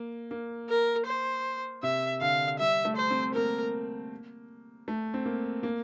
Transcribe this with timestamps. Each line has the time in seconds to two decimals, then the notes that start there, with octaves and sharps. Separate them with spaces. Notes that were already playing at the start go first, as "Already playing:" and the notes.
Already playing: A#3
0.31 A#3
0.69 A#4
1.06 C5
1.83 C3 E5
2.21 D3 F5
2.59 G3 E5
2.85 A3
2.97 C5
3.10 C4
3.35 A#3 A#4
4.88 A3
5.14 C4
5.25 A#3
5.63 A#3